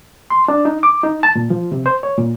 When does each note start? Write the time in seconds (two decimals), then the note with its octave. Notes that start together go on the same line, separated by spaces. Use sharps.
0.30 C6
0.48 D4
0.65 D#4
0.83 D6
1.03 D#4
1.23 A5
1.36 A#2
1.50 F3
1.72 C3
1.86 C5
2.03 C#5
2.18 A#2